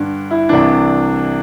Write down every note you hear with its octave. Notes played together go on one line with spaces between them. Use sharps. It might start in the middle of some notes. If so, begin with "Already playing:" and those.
Already playing: G2 D3
E4
C2 C3 E3 D4